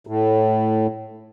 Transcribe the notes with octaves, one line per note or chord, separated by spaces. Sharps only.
A2